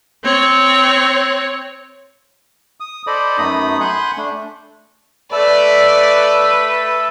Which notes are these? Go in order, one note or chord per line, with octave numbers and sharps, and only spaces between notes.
C4 C#5
D#6
A4 C5 D5 D#5 B5 D6
F#2 A3 B3 D#4 B5 D#6
F#5 G#5 B5 C6 F#6 G6
A3 D4
A3 A4 B4 D5 E5 A5